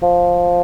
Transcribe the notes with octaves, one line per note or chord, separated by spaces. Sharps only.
F3